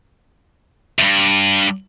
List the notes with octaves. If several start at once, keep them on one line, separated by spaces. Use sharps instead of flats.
E2 G2